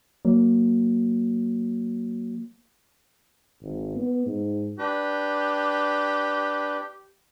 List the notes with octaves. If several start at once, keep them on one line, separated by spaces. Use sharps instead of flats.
F#3 A#3
G#1
B3
G#2
D4 G4 B4